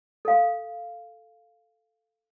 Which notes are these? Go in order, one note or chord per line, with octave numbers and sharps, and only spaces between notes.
A4 F5